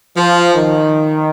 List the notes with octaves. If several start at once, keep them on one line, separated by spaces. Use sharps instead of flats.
F3
D#3